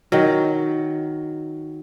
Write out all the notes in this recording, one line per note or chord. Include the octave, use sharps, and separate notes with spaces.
D#3 F#3